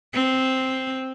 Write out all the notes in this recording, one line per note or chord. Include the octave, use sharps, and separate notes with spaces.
C4